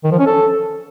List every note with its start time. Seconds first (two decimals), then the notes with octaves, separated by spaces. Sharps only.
0.04 D#3
0.11 F3
0.19 C#4
0.26 A4